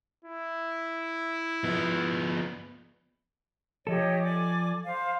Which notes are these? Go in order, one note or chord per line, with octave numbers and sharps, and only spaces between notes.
E4
F3 B3
F3 G4 A4 C#5 D#5
D5 G#5 D6
C5 F5